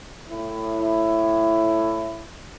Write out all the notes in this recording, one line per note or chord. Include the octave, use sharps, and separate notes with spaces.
A2 E4